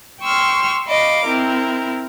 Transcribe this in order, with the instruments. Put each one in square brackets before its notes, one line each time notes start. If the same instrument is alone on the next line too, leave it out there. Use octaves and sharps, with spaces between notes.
[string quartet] G5 C6 C#6 E6 F6
D#5 F5 B5 D6
C4 E4 A#4